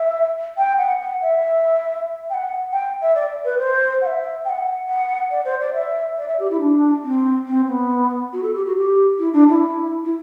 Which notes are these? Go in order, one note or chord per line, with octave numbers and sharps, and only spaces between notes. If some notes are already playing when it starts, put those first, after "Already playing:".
Already playing: E5
G5
F#5
F#5
E5
G5
F#5
G5
E5
D5
B4
C5
F#5
E5
G5
F#5
F#5
D5
C5
D5
E5
D5
E5
G4
E4
D4
C4
C4
B3
F#4
A4
G4
F#4
G4
E4
D4
E4
E4